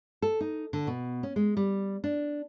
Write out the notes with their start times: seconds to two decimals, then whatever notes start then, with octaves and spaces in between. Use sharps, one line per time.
0.22 A4
0.41 D#4
0.73 D3
0.87 B2
1.23 C#4
1.36 G#3
1.57 G3
2.04 D4